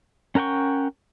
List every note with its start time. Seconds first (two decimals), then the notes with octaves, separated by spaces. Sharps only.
0.35 C#4 A#4 F#5 G5 C#6